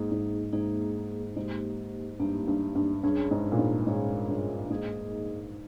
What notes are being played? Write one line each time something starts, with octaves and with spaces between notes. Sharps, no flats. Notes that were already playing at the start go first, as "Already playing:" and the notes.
Already playing: G#2 A#3 D#4 G#4
G#2
G#2 A#3 D#4 G#4
G#2 A#3 D#4 G4
G2 A#3 D#4 G4
G2
G2
G2 C#4 G#4 C#5
G#2
A#2
G#2
G#2 C#4 G#4 C#5
G2
G#2 A#3 D#4 G#4 D#5